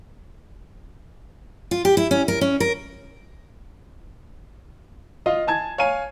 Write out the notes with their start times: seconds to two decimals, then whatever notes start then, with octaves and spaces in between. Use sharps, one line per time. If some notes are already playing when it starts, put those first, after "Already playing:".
1.71 F4
1.85 G4
1.97 E4
2.11 C#4
2.28 A#4
2.41 C#4
2.60 A#4
5.26 F4 D#5 F5
5.47 G#5 A5 G#6
5.78 C#5 F5 G#5 D#7